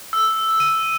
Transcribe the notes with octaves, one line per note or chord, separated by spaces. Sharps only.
E6
D#7